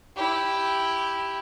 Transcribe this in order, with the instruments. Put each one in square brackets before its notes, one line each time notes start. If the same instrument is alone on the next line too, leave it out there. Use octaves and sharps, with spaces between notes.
[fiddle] E4 G4